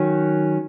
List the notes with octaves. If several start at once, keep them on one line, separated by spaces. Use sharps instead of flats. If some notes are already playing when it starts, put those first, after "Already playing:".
Already playing: D#3 F#3 C#4